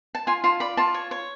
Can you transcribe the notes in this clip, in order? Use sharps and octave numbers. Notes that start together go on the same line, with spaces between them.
A5
F4 G#5
F4 A5
D5 B5
F4 A5
C#5
C#5